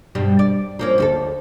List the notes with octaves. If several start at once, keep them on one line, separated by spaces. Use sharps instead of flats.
G2 B2 G3
D5
F3 A#3 C#4
D2 F#4 A4